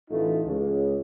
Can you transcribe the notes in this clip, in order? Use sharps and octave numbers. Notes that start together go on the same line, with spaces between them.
A1 E3 A3 D#4 F4
C#2